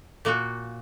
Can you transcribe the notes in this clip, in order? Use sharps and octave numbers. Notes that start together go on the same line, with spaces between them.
A#2 A#3 F#4